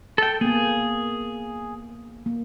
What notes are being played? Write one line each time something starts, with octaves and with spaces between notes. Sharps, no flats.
A4 G5
A#3 B3 G#4
A#3